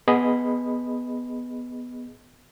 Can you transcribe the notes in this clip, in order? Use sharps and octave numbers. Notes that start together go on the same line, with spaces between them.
B3 G#4 D#5 B5